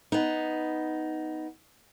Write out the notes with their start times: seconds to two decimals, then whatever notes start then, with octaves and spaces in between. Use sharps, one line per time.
0.12 B3 D#4